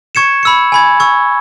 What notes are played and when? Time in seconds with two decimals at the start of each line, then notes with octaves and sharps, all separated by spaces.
0.15 C#6 G#6 C#7 E7
0.43 B5 E6 C#7
0.72 G#5 B5 G#6
1.00 C#6 E6 G#6